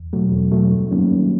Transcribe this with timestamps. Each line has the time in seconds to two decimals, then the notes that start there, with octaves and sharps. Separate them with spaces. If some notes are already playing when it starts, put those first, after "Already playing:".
Already playing: E2
0.13 B2 F#3 A3
0.32 E2
0.51 B2 F#3 A3
0.72 G2
0.91 D#3 F#3 A#3 C#4
1.11 G2